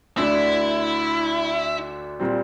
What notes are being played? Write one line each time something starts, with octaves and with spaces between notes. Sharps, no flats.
D2 D3 A3 D4 E4
A#2 G3 C4